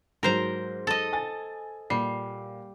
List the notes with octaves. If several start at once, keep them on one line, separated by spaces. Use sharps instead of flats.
G#2 F#3 A#4 C5 A#5
A4 D#5
G#5 A6
A#2 G3 C7